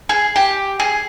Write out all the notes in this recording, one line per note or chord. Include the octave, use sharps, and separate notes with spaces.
G#4
G4
G#4